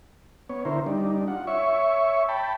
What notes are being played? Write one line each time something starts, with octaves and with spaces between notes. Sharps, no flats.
B3 C#5
D3 E4 A#4 C5
G3 D4 D#4
F4 F#5
C#5 E5 C#6
G5 A5 B5